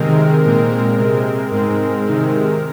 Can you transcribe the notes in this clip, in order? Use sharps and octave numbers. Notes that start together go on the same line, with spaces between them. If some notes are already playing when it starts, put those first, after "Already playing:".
Already playing: C3 D#3 G#3 C4 A#4
A#2 G#3 C4 A#4
C3 G#3 C4 A#4
G#2 G#3 C4
C3 D#3 G#3 C4